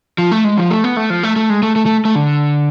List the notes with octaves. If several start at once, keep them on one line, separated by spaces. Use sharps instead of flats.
F3
A3
G#3
F3
A3
B3
A3
F3
A3
A3
G#3
A3
A3
A3
A3
D3